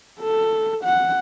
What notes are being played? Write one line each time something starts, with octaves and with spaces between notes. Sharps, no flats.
A4
F#5